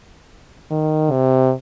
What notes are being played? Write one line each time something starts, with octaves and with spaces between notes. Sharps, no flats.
D#3
C3